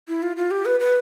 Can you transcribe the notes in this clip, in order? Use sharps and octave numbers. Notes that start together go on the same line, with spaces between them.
E4
F4
F4
G4
B4
B4